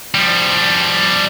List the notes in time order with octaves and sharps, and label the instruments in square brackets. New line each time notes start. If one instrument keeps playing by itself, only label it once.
[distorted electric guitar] F3 G3